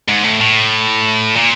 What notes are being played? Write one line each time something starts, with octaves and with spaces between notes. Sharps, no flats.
G#2
A2
A2
A#2